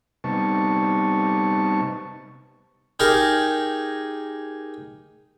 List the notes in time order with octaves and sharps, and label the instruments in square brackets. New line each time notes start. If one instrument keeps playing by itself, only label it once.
[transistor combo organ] C3 G3 B3 D#4 A5 C#6
[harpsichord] D#4 G4 G#4 A#4